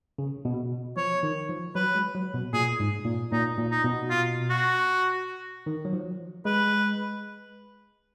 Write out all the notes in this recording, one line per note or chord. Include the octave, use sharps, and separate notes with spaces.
C#3
B2
F3 C#5
D#3
F3
F#3 B4
G#3
F#3
B2
A#2 G#4
G#2
A#2
A#2 D#4
A#2
D#4
B2
F4
F#4
D#3
F#3
F3
G#3 B4